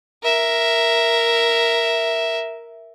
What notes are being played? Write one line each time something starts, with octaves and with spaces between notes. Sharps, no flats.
A#4 E5